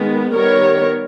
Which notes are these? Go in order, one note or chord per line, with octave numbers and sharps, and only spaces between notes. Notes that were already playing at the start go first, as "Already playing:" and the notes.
Already playing: D#3 G#3 B3
D#3 G3 B3 A#4 C#5